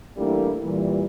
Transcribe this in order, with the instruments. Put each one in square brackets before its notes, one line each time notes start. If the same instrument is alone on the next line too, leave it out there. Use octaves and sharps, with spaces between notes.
[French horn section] E3 G3 A3 A#3 D4 E4
A#2 E3 G3